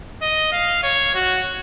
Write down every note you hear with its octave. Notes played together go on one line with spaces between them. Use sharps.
D#5
F5
C#5
F#4